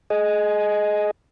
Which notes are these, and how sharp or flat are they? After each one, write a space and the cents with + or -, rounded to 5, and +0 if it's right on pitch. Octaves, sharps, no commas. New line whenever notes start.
G#4 +25 D#5 +0 G#5 +25